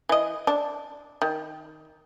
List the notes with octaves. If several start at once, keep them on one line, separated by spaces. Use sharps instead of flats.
E3 D#5
D4
D#3